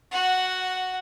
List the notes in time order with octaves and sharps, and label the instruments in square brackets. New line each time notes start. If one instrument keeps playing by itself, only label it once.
[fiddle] F#4 F#5